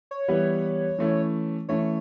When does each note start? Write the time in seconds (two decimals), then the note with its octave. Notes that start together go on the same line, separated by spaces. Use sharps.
0.11 C#5
0.28 E3 G3 B3 E4 B4
0.98 E3 A3 C#4 E4
1.69 E3 A3 C#4 E4 C#5